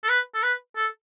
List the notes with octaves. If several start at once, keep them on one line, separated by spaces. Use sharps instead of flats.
A4
B4
A4
B4
A4